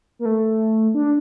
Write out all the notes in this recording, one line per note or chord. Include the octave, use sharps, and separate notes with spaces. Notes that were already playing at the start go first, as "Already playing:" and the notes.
A#3
A3
D4